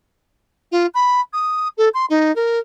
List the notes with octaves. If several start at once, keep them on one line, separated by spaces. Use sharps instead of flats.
F4
B5
D#6
A4
C6
D#4
A#4